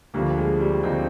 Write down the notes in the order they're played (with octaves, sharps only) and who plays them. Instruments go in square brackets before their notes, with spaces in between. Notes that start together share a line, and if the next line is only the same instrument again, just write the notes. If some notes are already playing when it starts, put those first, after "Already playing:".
[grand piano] D2 D3 F3 G3 A#3
G#3
G3
D2 D3 F3 C4 D#4